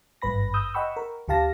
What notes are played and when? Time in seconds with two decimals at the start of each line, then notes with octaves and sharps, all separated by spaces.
0.22 G#1 G2 B4 B5 A#6
0.54 D#6 E6 G6
0.74 D#5 F#5 G5 B5 C#6 E6
0.97 A#4
1.28 D2 D3 G4 F5 A5 A#6